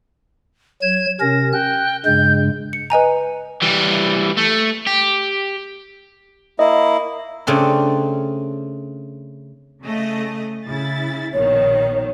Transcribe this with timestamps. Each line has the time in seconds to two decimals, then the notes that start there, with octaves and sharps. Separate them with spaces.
0.82 F#3 G#6 E7
1.20 C3 C#4 A#4 A#6
1.53 G5 F#6
2.05 G2 C#3 G#3 G6
2.73 C#7
2.90 B4 D#5 G#5 A#5
3.62 E3 G3
4.38 A3
4.87 G4
6.59 A#3 E4 D#5
7.47 C#3 A3 C4 D4
9.82 C#3 A3 D#5
10.67 C#3 E4 A6
11.33 A#1 B2 D#3 C#5